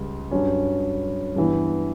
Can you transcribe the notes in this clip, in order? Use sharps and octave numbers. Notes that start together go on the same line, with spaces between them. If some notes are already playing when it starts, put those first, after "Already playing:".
Already playing: C#2 G3
G2 F#3 C#4
G2 E3 B3